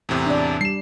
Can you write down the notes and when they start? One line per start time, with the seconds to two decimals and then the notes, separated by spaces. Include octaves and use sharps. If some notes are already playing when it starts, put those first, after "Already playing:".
0.09 E2 A2 C3
0.27 D4 D5
0.61 G3 C7 E7